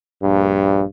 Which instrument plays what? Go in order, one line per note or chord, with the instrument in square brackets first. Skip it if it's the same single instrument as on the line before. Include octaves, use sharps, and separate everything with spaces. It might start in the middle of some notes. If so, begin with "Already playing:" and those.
[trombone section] A#1 G2